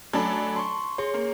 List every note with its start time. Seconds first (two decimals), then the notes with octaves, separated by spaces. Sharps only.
0.13 F#3 A3 D4 A4 G#5 B5
0.56 A5 C6 C#6
0.98 G#4 C#5 C6
1.14 A#3